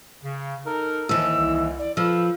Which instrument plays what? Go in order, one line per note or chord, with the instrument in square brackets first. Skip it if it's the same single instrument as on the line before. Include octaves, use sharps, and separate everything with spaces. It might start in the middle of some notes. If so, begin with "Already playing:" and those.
[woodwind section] C#3
D#4 A4 A#4
[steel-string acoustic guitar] D#2 E3 [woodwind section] F3 [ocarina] E6
[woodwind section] C2
[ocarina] D5
[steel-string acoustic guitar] F3 [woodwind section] A4 B4 F5 [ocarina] E6